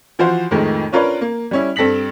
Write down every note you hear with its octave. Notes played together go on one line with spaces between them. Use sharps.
E3 F3 F4 F#4 C5
F2 A2 D#3 F3 G#3 A3
C#4 D4 F4 A#4 B4 C#5
A#3
G3 C#4 E4
G2 C4 A4 A#6 B6 F#7